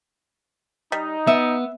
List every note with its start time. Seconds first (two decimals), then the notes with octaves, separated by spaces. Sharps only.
0.92 G3 D#4
1.27 B3 E5